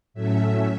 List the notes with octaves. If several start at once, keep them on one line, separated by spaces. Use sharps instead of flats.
A2 F#3 A3 C#4 E5